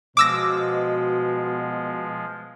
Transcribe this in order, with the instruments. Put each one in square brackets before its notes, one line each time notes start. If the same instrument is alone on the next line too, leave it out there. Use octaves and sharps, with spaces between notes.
[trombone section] B2 [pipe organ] F3 G#3 [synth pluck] D6 E6 A#6